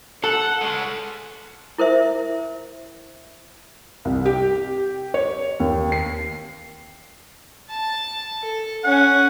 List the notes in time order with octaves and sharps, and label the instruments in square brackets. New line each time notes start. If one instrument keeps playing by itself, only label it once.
[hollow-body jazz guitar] A4 [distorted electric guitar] F#5
[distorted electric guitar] G#3 C#4
[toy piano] E4 A#4 C5 E5
[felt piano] C2
G4
C#5
D#2
C7
[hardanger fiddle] A5
A4
[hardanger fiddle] C#4 G#5 [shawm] F#5